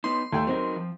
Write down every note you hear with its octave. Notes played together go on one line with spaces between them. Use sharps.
B3 D#4 C6
D#2 A3 G5
F#3 C4 D#4 A#4
F3